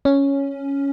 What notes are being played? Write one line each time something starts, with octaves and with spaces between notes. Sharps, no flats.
C#4